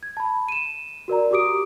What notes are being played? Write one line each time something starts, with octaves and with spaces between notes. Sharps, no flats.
G#6
A5 B5
D#7 E7
F#4 A#4 D5 A#5
F#4 G4 D6 D#6 D7